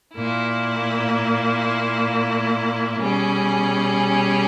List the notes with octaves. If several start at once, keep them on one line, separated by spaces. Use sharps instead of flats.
A#2 A#3 E4
B2 G3 C#4 G#4